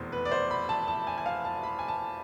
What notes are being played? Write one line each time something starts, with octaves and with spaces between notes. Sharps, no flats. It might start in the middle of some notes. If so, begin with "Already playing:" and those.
Already playing: F1 E2 B2 C5
B4
D5
C5
B5
A5
A5
G#5
G#5
F5
A5
B5
G#5
A5